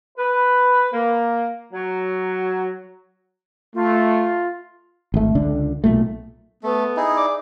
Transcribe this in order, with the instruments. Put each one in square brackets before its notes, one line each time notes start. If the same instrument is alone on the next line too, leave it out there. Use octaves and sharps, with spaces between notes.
[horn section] B4
A#3
F#3
[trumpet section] A3 [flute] F4
[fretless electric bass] G#1 A3
C#2 D3 D4
B1 A#2 A3
[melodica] A3 [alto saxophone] B3
[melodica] D#4 E4 G#4
[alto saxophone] D5